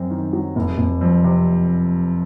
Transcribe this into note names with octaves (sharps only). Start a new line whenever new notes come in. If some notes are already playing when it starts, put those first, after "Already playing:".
Already playing: F#2 C4
D#3
F#3
F1
F1
F2
C3